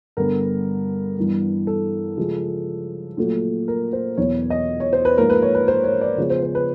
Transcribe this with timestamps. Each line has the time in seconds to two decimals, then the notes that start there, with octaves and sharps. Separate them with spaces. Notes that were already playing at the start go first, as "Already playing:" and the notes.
0.17 G2 D3 G3 B3 A#4
1.17 G2 E3 G3 B3
1.67 A4
2.17 C#3 F3 G#3
3.17 A#2 F#3 A3
3.68 A#4
3.93 C5
4.17 E2 B2 F#3 B3 C#5
4.50 D#5
4.80 C#5
4.93 C5
5.05 B4
5.17 G#2 F3 A#3 A#4
5.30 B4
5.42 C#5
5.55 B4
5.68 C5
5.84 C#5
6.01 D5
6.17 C#3 F3 G#3 B3 C#5
6.30 C5
6.43 C5
6.55 B4